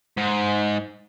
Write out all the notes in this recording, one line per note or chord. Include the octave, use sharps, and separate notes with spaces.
G#2